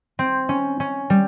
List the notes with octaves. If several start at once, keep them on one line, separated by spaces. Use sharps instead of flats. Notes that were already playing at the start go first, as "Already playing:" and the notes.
C4
C#4
C#4
G3